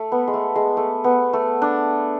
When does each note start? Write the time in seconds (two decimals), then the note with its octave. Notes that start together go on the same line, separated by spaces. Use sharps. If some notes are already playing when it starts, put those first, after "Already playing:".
Already playing: A3
0.12 B3
0.28 G#3
0.34 A3
0.55 G#3
0.77 A3
1.04 B3
1.33 A3
1.62 D4